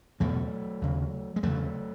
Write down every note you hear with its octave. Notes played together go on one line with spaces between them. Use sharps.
E2 B2 F#3 A3
D#2 C#3
G#3
E2 C#3 F#3 A3